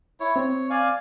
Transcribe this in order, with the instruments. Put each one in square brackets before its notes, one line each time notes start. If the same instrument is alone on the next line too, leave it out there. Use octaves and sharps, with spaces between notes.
[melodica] E4 C#5
[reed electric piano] C4 [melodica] C#5
[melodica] D5 F5 G#5